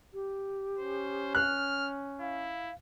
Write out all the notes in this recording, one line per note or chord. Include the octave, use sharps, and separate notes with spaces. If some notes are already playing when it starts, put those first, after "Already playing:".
G4
C#4 C5
F6 F#6
E4 F5